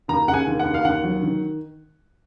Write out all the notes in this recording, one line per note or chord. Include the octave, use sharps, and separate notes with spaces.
D#2 A#5
C#3 F#5
G#5
D#2
F#5
D#2
F5
D#2 F#5
F#3
D#3